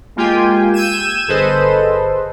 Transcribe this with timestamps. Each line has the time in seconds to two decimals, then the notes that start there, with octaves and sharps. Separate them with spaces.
0.16 G#3 A#3 F4 G4 G5 G#5
0.74 E6 G6 G#6 D#7 E7
1.28 G1 G#4 A4 B4 C5 D#5